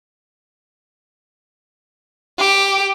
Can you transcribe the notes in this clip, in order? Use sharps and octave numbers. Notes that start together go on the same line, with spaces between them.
G4